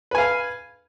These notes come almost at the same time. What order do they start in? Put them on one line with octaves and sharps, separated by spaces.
B4 G#5 F5